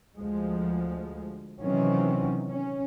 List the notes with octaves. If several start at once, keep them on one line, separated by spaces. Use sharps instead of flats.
D2 F3 G#3
C3 D#3 E3 F#3 C4 C#4
C#4